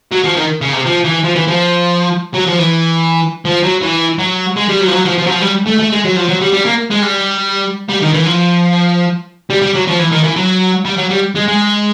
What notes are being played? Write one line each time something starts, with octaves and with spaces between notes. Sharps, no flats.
F#3
F3
D#3
C#3
C3
F3
E3
F3
E3
F3
F#3
F3
E3
F3
F#3
E3
F#3
G#3
G3
F#3
F3
F#3
F3
F3
F#3
F3
G3
A3
A3
G#3
F#3
F3
F#3
G3
G3
A#3
G#3
G3
G3
D#3
E3
F3
G3
G3
F#3
F3
E3
D#3
E3
F#3
G3
F#3
G3
G#3
G#3